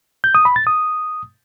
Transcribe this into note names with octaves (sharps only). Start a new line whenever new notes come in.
G6
D#6
B5
A6
D#6